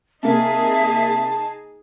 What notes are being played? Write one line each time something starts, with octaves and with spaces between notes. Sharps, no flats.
C3 A#3 D#4 G#4 E5 A5